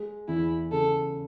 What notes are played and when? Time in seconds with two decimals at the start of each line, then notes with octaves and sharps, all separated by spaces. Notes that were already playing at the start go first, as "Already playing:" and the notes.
Already playing: G#3
0.28 E2 E4
0.72 C#3 A4